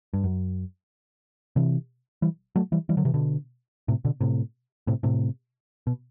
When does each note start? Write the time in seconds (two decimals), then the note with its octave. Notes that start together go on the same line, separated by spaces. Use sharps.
0.13 G2
0.24 F#2
1.56 C3 E3
2.22 E3 G3
2.56 F#3 A3
2.72 E3 G3
2.89 E3 G3
2.97 D3 F#3
3.05 C3 E3
3.14 B2 D3
3.88 A2 C3
4.05 B2 D3
4.21 A2 C3
4.87 A2 C3
5.03 A2 C3
5.87 B2